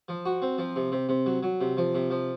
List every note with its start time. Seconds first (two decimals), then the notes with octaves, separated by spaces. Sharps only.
0.08 F3
0.25 F#4
0.42 C4
0.58 F3
0.76 C3
0.92 C3
1.09 C3
1.26 F#3
1.43 F#3
1.61 C3
1.77 F3
1.95 C3
2.10 F3